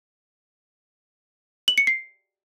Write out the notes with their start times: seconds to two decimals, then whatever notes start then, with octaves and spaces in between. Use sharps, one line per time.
1.68 F#7
1.78 C#7
1.87 C7